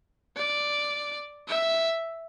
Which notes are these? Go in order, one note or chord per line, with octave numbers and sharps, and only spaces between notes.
D5
E5